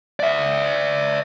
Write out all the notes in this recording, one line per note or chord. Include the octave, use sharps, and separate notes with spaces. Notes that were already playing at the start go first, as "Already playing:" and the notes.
D5 E5